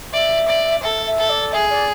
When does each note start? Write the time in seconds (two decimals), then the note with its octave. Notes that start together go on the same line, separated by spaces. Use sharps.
0.14 D5 E5
0.48 D5
0.83 A4 E5
1.06 E5
1.18 A4
1.30 D5
1.53 G#4 E5
1.70 D5